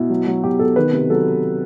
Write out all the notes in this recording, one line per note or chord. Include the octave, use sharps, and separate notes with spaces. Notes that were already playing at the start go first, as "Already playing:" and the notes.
Already playing: B2 E4
F#3
F#3
B2 G4
B2 A4
D#3 B4
C3
F#3 A4